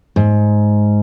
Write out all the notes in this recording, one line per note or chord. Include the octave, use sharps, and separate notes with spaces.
G#2